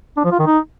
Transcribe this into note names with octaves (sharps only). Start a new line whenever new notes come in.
D4
F3
F4
D#3
D#4